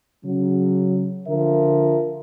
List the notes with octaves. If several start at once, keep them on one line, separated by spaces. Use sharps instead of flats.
C#3 F#3
D3 F3 A#4 E5